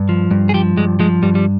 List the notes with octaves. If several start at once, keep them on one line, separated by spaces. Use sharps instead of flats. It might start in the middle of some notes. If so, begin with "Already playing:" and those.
Already playing: G2
F3
G2
G#4
F3 G4
G2 G#3
F3 G#3
G2 G3
G3